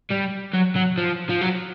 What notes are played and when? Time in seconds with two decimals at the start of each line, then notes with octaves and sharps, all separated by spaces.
0.11 G3
0.54 F#3
0.76 F#3
0.98 F3
1.29 F3
1.41 F#3